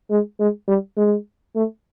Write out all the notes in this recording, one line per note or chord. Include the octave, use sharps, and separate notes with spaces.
G#3
G#3
G3
G#3
A3